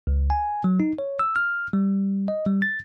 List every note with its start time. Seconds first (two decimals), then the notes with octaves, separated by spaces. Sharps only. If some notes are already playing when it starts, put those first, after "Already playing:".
0.07 C#2
0.30 G#5
0.64 F#3
0.80 D#4
0.99 C#5
1.19 E6
1.36 F6
1.73 G3
2.28 D#5
2.46 G3
2.62 A6